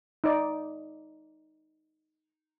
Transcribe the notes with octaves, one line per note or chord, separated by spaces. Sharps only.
D#4 D5